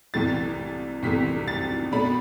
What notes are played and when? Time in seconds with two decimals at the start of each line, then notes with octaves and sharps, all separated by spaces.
0.14 C2 C3 E3 A3 A6
1.03 C2 C3 E3 A3 B6
1.48 A6
1.92 B2 A3 D4 B5